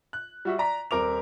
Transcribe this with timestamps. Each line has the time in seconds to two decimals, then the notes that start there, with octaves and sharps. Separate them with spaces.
0.13 F#6
0.45 G3 F#4 E5
0.58 D5 A#5 B6
0.91 D#1 C4 A#4 D6 F7